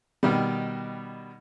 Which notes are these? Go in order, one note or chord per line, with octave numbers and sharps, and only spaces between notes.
B2 D#3 G3